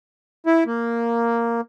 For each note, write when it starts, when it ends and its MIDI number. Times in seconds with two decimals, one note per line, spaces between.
0.46 0.64 64
0.66 1.61 58